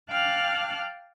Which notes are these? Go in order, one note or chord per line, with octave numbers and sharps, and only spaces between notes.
F5 G5 A5 D6 F6 F#6